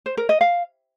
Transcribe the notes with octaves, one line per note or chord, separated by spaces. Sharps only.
C5
A#4
D#5
F5